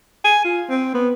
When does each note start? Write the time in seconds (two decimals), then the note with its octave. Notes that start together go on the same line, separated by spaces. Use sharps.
0.24 G#5
0.44 F4
0.70 C4
0.94 B3